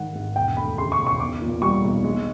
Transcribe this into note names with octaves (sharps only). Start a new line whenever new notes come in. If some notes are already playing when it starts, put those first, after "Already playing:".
Already playing: G#2 D#3 F#5
G#1
E1 G5
D2 B5
C#3 C6
C#6
E1
C#6
B1 D6
A#2
G3 C#6
B1
G#3